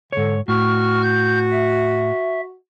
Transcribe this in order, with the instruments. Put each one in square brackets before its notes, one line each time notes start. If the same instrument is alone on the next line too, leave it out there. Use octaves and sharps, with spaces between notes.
[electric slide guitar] G#2 C#5 [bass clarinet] D3
[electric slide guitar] A2 [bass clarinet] F#4 [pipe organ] C#6 F6
[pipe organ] G6
E5